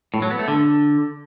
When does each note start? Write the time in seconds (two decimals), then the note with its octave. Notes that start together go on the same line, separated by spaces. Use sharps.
0.14 A2
0.22 F#3
0.31 B3
0.39 A3
0.48 D3